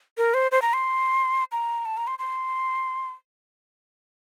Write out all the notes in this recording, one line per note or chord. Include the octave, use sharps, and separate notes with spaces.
A#4
C5
C5
A#5
C6
A#5
A5
A#5
C6
C6